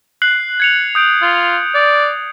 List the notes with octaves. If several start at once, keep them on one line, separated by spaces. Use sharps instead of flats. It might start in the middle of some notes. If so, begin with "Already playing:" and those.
F#6 C7 F#7
G#6 C#7 F7
D#6 G6 D7
F4
D5